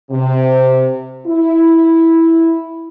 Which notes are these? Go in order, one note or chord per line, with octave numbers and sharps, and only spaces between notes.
C3
E4